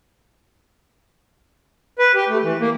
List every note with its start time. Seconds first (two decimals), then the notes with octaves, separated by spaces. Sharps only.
1.99 B4
2.15 G4
2.29 A3
2.43 E3
2.60 A#3